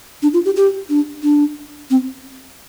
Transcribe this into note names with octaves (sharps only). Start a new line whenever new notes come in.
D4
F4
G4
G4
D4
D4
C4